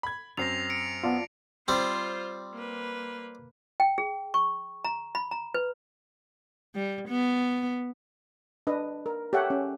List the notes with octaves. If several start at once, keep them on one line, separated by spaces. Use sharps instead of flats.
B5 G#6
F#2 C4 A#6 C7 F7
C#7 D7
B3 F4 D5 A5
G3 C4 F4 C5
A#3 B4
G5
G#4
C#6
A#5
B5
A#5
B4
G3
B3
D4 B4 D#5
A#4
G4 A4 C#5 E5 F#5 G5
C#4